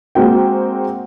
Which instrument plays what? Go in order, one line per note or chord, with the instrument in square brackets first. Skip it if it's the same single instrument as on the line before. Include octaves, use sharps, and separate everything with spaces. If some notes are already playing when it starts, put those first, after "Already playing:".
[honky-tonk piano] G#3 A#3 C4 F#4 G5